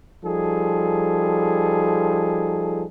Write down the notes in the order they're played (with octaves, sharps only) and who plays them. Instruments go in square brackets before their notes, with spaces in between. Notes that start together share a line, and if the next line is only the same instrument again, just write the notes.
[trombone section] F3 G3 D#4 G#4 A4